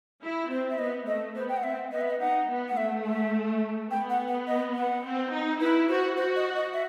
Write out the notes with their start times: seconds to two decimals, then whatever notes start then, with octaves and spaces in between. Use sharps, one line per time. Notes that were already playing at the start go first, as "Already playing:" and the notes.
0.23 E4
0.50 C4 C5
0.71 E5
0.79 B3 D#5
1.07 A3 D#5
1.35 B3 C5
1.49 G5
1.57 F#5
1.64 C4 E5
1.91 B3 D#5
2.01 E5
2.10 D#5
2.20 D#4 F#5
2.49 B3
2.68 F#5
2.77 A3 E5
3.05 E5
3.90 B3 G5
4.10 F#5
4.28 F#5
4.47 D#5
4.75 F#5
5.04 C4
5.31 D#4
5.60 E4 B4
5.89 F#4 C5
6.16 F#4 C5
6.36 D#5
6.55 D#5
6.73 E5